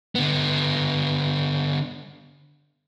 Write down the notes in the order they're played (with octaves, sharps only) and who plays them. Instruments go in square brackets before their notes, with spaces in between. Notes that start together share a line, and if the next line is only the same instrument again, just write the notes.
[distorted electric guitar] D3 B3